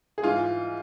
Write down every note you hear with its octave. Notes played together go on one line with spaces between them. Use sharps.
G#4
G#2 E3 F4